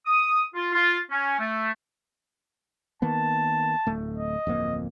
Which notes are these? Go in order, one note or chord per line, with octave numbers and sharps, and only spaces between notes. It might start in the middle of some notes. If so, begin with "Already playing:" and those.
D#6
F4
F4
C#4
A3
D#3 A#3 B3 A5
D1 A3
D#5
D1 F2 A#3